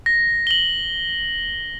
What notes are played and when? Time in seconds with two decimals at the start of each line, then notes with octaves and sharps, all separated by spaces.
0.06 A#6
0.47 F#7 G7